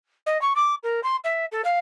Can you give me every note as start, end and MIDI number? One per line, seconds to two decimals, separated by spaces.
0.26 0.40 75
0.41 0.53 85
0.55 0.75 86
0.83 1.00 70
1.03 1.16 84
1.24 1.45 76
1.52 1.62 69
1.64 1.79 77